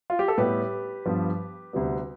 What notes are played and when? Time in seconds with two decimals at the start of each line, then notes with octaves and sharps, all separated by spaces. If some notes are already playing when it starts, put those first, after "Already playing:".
0.10 F4
0.19 G4
0.28 A4
0.38 A2 G3 B3 G4 B4
1.06 G2 F3 B3
1.73 D2 C3 G3 B3